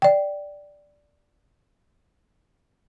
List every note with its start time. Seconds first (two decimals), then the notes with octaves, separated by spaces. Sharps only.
0.02 D5 G5